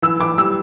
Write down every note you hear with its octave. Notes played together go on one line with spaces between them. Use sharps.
E3 E6
E3 D6
G3 E6